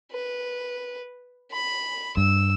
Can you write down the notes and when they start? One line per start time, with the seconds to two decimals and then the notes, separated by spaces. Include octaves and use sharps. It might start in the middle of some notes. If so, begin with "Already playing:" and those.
0.12 B4
1.52 B5
2.17 G2 E6